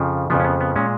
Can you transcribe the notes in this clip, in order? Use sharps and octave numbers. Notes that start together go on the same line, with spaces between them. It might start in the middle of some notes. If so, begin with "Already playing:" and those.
Already playing: F2 C#3 F3
F2 C#3 F3 B3
C#4
B3
B3
A#2 G#3 C#4